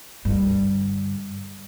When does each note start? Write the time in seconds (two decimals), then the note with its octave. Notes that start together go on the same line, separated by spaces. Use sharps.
0.25 G2 D3